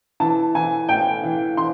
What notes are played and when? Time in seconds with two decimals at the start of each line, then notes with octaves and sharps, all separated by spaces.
0.20 E3 A5
0.55 E3 G#5
0.89 A2 G5
1.23 E3
1.57 E3 C6